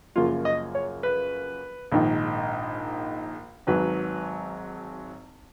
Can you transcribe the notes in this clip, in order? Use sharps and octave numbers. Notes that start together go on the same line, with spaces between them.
F#2 C#3 F3 A#3 F4
D#5
C#5
B4
A#1 G#2 D#3
G#1 G#2 F#3 B4